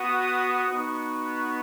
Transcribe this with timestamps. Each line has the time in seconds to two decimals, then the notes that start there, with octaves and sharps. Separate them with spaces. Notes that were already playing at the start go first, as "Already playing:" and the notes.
Already playing: B3 F#4 D#6
0.69 B3 D#4 F#4 C#6